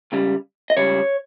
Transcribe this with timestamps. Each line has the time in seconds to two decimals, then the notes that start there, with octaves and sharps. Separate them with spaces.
0.12 C#2 C#3 G3
0.70 D#5
0.77 C#2 C#3 G3 C#5